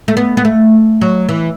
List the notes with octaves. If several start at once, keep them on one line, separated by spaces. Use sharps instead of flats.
A3
B3
B3
A3
F#3
E3